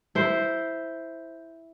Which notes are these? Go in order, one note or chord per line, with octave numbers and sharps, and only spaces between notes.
E4 C5